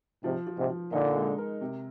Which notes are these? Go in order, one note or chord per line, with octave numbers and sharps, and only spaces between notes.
G#2 C3 F3
F3
G#2 C3
F3
A#2 D3 D#4
G#3
A#4
C3